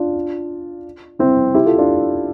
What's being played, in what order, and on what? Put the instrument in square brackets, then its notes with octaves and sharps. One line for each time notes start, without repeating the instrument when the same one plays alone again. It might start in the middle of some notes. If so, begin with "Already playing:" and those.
Already playing: [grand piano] D4 F4
C4 E4
E4 G4
F4 A4
D4 F4